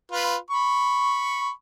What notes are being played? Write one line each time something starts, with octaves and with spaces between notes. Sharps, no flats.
F4 B4
B5 C#6